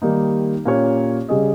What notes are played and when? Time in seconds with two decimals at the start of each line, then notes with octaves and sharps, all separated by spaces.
0.02 D#3 G3 A#3 D#4
0.65 A#2 A#3 C#4 G4 C#5
1.29 C#3 G3 C#4 G#4 D#5